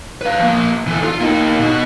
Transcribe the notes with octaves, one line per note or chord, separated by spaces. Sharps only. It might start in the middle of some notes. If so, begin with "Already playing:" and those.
B4 F5
F3 A#3
E3 A4
F4
A#3 D#4
B2 F#4